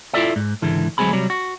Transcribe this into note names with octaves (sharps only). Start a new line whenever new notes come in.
E4 F4 G#4 A4 D5 E5
G#2
C#2 G#2 D3 E3
D2 F#3 G#3 C4 G#4 B5
C3 F#3 G3
F#4